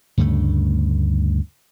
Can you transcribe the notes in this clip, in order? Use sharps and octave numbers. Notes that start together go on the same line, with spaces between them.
D2 G2 C#3 A3